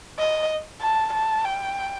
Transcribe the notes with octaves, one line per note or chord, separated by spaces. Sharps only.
D#5
A5
A5
G5